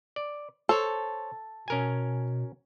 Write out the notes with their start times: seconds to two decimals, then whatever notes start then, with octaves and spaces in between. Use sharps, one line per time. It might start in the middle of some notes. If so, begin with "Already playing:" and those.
0.16 D5
0.69 A4 C5 C#5
1.68 B2 C#4 A#4 G#5